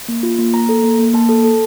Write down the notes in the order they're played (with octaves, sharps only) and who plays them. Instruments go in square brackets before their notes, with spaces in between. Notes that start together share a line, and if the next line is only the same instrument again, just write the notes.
[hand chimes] A#3
F4
A#3
A#3 A#5
A4
A#3
A#3
A#3 A5
A4
A4